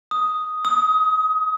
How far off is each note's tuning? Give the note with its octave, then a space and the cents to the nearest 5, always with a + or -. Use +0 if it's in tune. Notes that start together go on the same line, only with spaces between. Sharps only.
D#6 +5
D#6 +30